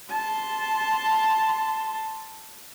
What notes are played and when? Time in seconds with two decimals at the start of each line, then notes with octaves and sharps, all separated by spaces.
0.11 A5 C6